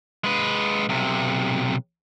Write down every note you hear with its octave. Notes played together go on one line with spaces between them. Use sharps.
G#3 B4
B1 C3